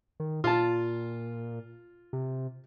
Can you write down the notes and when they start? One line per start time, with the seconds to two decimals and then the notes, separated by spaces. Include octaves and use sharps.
0.20 D#3
0.44 A#2 F4 A5
2.13 C3